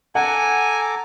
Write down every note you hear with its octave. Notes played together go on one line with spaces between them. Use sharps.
A4 F#5 G#5 A#5 D6